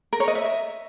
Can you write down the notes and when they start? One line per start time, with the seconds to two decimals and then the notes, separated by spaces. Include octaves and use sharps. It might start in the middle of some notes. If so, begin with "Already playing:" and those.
0.13 A#4
0.20 C#5
0.28 D#5
0.35 E5